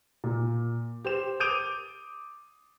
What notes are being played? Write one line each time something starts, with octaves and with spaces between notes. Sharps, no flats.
A#2
G4 C5 E7
D6 D#6 G6 D7 D#7 F7